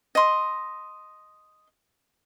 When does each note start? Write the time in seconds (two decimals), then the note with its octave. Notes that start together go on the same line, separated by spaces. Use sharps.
0.15 D#5 C6